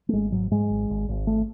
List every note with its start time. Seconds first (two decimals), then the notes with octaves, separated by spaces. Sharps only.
0.09 A3
0.13 G#1 G#3
0.32 G#2 F#3
0.51 G#2 G#3
0.70 G#1
0.90 G#1
1.09 G#1
1.27 A3